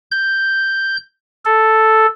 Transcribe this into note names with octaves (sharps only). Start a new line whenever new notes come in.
G6
A4